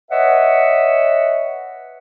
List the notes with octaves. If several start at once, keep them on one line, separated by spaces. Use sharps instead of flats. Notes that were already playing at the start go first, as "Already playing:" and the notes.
B4 C#5 D#5 E5 F#5